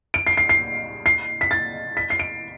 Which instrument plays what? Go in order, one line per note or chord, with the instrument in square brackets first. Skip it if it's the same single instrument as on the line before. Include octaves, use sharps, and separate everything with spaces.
[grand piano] D7
C7
C7
C7
C7
B6
A6
B6
C7
D7